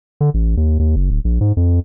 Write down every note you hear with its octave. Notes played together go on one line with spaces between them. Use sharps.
D3
A1
D#2
D#2
F#1
D1
A#1
G#2
F2